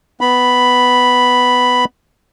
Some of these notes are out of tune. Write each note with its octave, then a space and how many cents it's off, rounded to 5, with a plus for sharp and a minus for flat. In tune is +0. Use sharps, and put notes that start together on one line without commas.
B3 +10 B5 +0